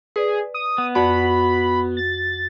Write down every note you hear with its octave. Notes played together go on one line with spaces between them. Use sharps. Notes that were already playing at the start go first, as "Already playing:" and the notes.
G#4 B4 D5
D#6
B3
F2 F#4 D5 B5
A6